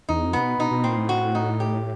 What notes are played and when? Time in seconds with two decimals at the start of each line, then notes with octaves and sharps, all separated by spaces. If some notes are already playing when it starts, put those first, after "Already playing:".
0.09 E2 D#4
0.25 F2
0.33 C3 B3
0.43 B2
0.59 B2 D#4
0.71 B2
0.84 A#2 C4
0.98 A2
1.09 F#4
1.35 D#4
1.60 G4